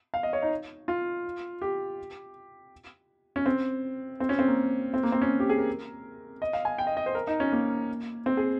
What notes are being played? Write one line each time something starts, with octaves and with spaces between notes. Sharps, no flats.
F5
D#5
C#5
D#4
F4
G4
C#4
C4
C4
C#4
C4
A#3
C4
A#3
C4
C#4
G4
G#4
A#4
D#5
F5
G#5
G5
D#5
D#5
C5
A#4
D#4
C#4
A#3
C4
G#4